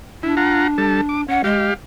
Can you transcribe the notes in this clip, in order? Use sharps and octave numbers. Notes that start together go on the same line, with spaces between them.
D4 E4
F4 F#5 A#5
G3 A4 A5
D6
C#4 F#5
G#3 G4 F5